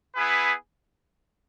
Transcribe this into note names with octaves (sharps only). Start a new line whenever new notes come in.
B3 E4 G#4 B4